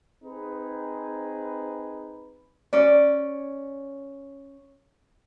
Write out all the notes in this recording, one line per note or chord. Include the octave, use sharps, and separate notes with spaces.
C4 D#4 G#4 B4
C#4 D5